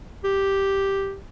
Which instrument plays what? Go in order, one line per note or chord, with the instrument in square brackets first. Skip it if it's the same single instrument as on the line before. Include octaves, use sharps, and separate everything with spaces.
[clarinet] G4